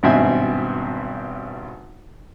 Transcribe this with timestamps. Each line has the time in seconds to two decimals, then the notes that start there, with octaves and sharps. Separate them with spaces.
0.03 G#1 G2 B2 C4 E5 G#5